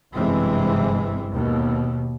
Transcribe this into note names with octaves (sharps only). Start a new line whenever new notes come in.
G1 F#2 C3 E3 G#3 C4
D#2 B2